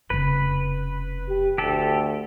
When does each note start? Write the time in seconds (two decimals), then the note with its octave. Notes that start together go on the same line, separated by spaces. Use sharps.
0.10 F1 C#3 B4
1.29 G4
1.58 D2 G4 A4